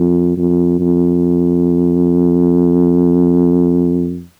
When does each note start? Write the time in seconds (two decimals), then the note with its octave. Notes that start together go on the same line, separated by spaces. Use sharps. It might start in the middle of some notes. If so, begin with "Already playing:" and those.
Already playing: F2
0.37 F2
0.79 F2